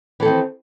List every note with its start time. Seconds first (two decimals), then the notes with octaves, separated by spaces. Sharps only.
0.20 E3
0.22 A4
0.25 D#3
0.28 C4